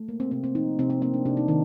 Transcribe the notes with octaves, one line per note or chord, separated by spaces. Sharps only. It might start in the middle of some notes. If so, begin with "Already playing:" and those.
Already playing: A3
A#3
C4
C3 C4
C4
F3 D#4
C3 C4
C4
A#3 C4
D4
C3 D4
D#4
D#3 D#4